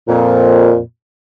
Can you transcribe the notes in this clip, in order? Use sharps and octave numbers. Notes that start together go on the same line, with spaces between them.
F2 A#2